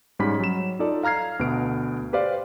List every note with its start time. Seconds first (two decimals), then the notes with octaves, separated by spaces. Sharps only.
0.19 G#2 G3 C#4 B5 B6
0.40 F#3 E7
0.79 D#4 F4 A4 D5 A5
1.03 F5 A#5 F6 G#6 C7
1.39 D2 B2 B4 D7
2.13 G4 B4 C5 D5 F5